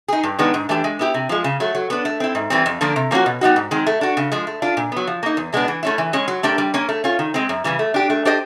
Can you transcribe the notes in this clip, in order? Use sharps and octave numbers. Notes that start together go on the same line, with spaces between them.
D#4 G#4
G2
D#3 G#3 B3 D4
G#2
E3 A3 D4 G4
G#3
B3 E4 G4
C3
F3 G#3
C#3
F#3 A3
F#3
B3 D4
A3
C4 E4
G#2
E3 G3 C4
F2
D3 F3 A#3 D4
C3
F3 A#3 C#4 F#4
B2
G3 B3 D#4 F#4
G#2
D#3 G#3 C4
A3
D4 F#4
C#3
F3 G#3
A3
D4 F4
A#2
F#3 B3
F3
A#3 D#4
E2
B2 G#3 B3 D4
E3
A3 C#4 E4
E3
G#3 C#4
F#3
A3 D4 G4 A#4
G3
A#3 C#4
A3
C#4 F4
D#3
G#3 C4
F#2
C#3 E3 G3
A3
D4 G4
A3
D4 G4 C5 D#5